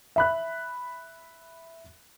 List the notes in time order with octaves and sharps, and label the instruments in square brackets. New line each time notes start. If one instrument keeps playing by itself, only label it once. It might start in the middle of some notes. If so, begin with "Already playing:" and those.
[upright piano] E5 B5 F#6